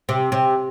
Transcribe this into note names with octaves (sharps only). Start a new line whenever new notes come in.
C3
C3